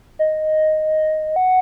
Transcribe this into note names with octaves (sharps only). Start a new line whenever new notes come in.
D#5
F#5